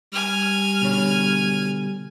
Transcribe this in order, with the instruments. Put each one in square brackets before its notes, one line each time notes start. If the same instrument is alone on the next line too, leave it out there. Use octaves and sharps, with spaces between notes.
[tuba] G3 [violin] G#5 F6
[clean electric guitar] B2 D3 C#5